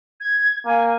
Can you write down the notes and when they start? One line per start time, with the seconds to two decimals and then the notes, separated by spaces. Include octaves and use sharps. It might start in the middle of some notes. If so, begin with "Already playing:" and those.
0.21 G#6
0.66 A#3 G#5